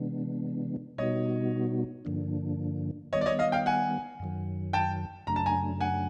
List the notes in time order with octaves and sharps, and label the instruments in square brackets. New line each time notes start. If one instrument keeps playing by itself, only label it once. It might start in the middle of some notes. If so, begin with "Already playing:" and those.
Already playing: [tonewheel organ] C3 E3 G#3 B3 D4
[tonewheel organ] B2 G3 B3 D#4 F#4 [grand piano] C#5 D#5
[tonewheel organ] G2 D3 F3 A#3 D4
[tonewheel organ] D#3 G3 B3 [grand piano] C#5 D#5
[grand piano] D5
C#5 D#5
D#5 F5
F5 G5
F#5 G#5
[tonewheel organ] F#2 D#3 F#3
[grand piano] G5 A5
[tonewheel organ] F#2 C#3 F#3 A3 D4 [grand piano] A#5
[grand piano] A5
G#5 A#5
F#5 G#5